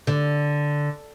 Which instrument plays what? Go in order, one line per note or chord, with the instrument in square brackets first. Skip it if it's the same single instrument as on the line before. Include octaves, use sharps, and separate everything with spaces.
[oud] D3